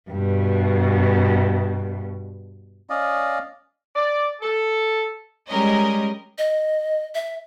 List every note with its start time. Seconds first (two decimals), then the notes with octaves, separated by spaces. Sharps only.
0.10 G2 B2
2.90 C#4 D5 D#5 F5
3.96 D5
4.41 A4
5.50 G3 G#3 C#4 A#4 D#5
6.38 D#5
7.15 E5